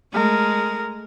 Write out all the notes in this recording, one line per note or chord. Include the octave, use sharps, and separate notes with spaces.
G#3 A3 A#4 F6